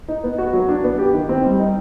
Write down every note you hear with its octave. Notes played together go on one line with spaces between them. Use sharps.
D#4
B3
F#4
F#3
D4
B3
G4
D#3
C4
G3
D#4